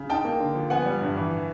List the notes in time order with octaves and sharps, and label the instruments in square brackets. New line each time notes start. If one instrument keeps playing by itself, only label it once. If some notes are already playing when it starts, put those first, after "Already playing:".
Already playing: [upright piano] C#3
[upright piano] D#4 [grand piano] G5 A5
[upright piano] A#3
D3
F3
[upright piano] B3 [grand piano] F#5 G#5
[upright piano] G3
G2
E3